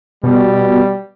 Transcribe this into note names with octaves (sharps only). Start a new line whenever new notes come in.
B2 G3